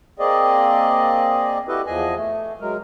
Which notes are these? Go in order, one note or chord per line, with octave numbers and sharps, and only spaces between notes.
A#3 C4 G#4 D5 D#5
E4 F#4 G4 A4 B4 D#5
E2 F3 G#4 D#5 G#5
A3
F#3 G#3 A#4